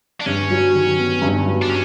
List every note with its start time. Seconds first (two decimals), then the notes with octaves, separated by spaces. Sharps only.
0.21 D4
0.26 G2 C#4
0.51 F#3
0.74 D#3
0.99 B3
1.22 G2
1.47 F#3
1.62 D4
1.70 C#4